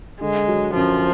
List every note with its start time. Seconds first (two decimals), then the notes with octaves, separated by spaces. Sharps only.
0.21 D3 G#3
0.48 F#3
0.75 F#2 F3